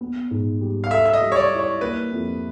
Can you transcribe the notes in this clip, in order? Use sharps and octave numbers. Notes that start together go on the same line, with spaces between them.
B3
G#2
G3
F5
A4 E5
E5
D#5
G3
C#5
D5
E4
C#5
A#3 B4
F2